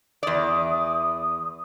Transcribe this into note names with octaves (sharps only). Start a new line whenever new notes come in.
E2 D5 D#6